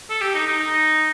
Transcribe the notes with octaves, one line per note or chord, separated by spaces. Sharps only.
A4
G4
D#4
D#4
D#4